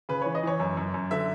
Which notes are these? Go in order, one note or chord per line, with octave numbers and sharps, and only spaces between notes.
C#3 B4
E3 C#5
D#5
E3 C#5
F#2
F#2
F#2
D3 E5